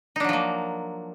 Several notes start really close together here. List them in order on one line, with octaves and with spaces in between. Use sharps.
D#4 D4 F#3 F3 A#3